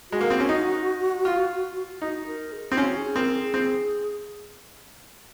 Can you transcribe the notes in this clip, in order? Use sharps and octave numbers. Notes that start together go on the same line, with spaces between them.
G#3 F#4
A#3
C4
C#4
D#4
F4
D#4 F#4
A#4
G#4
C4
C#4 F#4
G#4
C4 A#4
G#4
C4